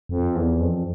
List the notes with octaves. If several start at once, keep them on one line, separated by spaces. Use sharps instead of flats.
F2
E2
F2